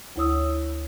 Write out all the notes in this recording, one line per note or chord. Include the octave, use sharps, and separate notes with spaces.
D2 E4 C#5 D#6 E6